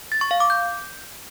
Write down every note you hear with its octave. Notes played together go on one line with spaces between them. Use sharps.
A6
C#6
F5
D6
G6